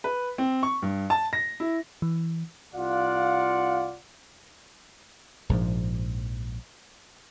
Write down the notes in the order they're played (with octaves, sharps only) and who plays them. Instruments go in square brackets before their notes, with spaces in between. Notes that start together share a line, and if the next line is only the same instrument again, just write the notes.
[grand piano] B4
C4
C#6
G2
A5
A#6
E4
[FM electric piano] E3
[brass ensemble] C2 F4 D5 F5 F#5
[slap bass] A#1 G#2 E3 F3